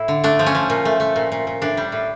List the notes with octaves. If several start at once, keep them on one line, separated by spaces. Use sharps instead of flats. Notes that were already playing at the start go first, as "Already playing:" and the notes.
Already playing: A2 E4
D3
A3 D4
F3
C#4
F3
A#2
A3
A3
A#2
A#2
A#2
A2 D4
G3
A2